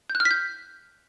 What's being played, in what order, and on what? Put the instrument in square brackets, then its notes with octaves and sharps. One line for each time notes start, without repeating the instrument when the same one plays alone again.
[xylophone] G6
F#6
F6
B6
G6